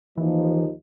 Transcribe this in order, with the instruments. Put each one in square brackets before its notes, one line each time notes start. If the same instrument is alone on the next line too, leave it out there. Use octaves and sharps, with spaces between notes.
[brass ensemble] D#2 F3 D#4 [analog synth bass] E3